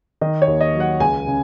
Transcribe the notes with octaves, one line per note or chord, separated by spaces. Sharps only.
D#3 D#5
C#5
D#2
D#5
F#3
F#5
C#2 G#5
C#3